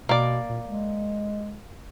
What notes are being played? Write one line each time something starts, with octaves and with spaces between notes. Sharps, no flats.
B2 A#3 D5
A#2
G#3